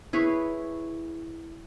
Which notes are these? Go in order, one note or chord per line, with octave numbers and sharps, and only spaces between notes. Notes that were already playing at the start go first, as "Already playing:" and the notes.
E4 G#4 B4 C#5